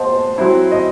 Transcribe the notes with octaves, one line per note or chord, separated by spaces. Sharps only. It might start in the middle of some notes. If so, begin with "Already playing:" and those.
Already playing: C5 D#5 F#5 A5
F#3 C4 E4
D#5